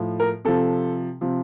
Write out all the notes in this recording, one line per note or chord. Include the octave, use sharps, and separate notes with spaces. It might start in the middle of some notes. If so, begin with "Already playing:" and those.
Already playing: A2 F3
A#4
C3 F3 A4
C3 F3